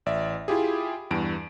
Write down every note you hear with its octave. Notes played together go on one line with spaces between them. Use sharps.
A1 D5 E5
E4 F4 G4 G#4
E2 G2 D7